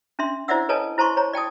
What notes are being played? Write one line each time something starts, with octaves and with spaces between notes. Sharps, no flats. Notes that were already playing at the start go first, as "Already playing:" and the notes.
C#4 D4 E5 C6
E4 C5 D5 E5 F#5 E6
A4 B4 C#5 D#5 G#5 A5
E4 C5 A5 A#5 C6 C#6
C5 C#5 A#5
D5 G5 A5 D#6